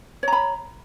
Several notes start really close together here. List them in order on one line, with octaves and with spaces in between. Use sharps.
C#5 A#5 B5